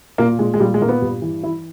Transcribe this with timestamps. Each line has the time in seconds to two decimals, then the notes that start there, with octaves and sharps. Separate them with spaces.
0.18 A#2 A#3
0.39 A#2 G#3
0.54 G#3
0.60 A#2 G3
0.74 G#3
0.82 A#2 A#3
0.88 B3
1.02 G2
1.22 E3
1.43 E3 E4